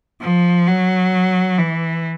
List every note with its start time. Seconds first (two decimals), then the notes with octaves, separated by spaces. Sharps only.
0.22 F3
0.68 F#3
1.58 E3